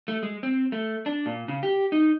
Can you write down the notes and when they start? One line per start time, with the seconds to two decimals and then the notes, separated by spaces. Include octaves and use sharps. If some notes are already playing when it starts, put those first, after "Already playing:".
0.08 A3
0.23 G#3
0.43 C4
0.72 A3
1.06 D4
1.26 A#2
1.48 C#3
1.63 G4
1.92 D#4